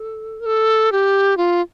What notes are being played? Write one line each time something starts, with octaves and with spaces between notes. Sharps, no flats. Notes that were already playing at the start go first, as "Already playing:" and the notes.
Already playing: A4
A#4
A4
G4
F4